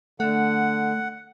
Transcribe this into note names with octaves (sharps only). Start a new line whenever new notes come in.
D3 A3 F#5